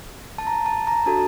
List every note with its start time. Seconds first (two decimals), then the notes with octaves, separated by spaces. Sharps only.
0.38 A5
0.47 A#5
0.66 A5
0.87 A#5
1.06 D4 F#4 A4 A5